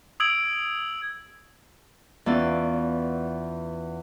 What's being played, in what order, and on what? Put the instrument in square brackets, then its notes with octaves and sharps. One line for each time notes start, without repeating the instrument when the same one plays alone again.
[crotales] D#6 E6 G#6 D7 F#7
[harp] E2 B3 C#4 E4 F4 D5